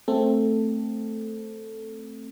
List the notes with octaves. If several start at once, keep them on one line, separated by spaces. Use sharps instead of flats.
A3 C4 A4